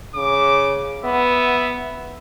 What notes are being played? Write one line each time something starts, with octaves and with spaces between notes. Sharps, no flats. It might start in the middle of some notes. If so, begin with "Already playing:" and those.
C#3 D6
B3 E5